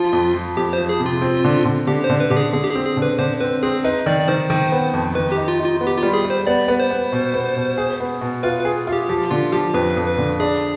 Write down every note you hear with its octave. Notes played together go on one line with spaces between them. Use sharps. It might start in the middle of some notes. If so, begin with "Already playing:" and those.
Already playing: F3 F4
F2
F3
F2 G4
C5
F3
G#4
C3
F4
C4
D3
D3
D3 G4
C5
D3
B4
D3 G4
G#4
D3 G#4
G4
G#4
C4
G#4
D3
B4
D3 C5
C4 B4
C4 G#4
D#4 B4
D#3 D5
D5
D#3 C5
D#3
B3
F2
D#3 B4
G4
D#4
F4
D#4
F4
B3
G4
F4
G3
G#4
G3
C5
B3 D5
B3
C5
B3
B2
B3
B2
G#4
B3
B2
F4 B4
B4
G#4
F4
G4
F3 G4
D3 F4
F3 G4
F2 B4
F2
B4
D3
D4 G#4